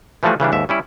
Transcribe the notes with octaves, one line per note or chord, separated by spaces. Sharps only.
E3 F3 G3 A3 F#4 G#4
C#3 E3 G3 D4
D#2 G#2 E5
G3 C#4 E4